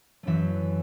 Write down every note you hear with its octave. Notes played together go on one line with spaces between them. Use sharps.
F#2 E3 A3 C#4 E5